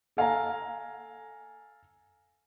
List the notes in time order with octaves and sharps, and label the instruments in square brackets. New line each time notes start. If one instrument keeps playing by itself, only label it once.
[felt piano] A4 F5 G#5 A#5